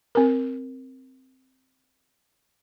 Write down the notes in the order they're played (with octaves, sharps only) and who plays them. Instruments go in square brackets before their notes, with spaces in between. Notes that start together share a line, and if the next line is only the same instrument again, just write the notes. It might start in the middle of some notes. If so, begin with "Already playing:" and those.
[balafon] C4 A#4